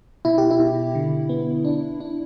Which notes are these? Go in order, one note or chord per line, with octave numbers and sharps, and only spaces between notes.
B2 E4
G4
E4
B2
D3
B3
D4
D4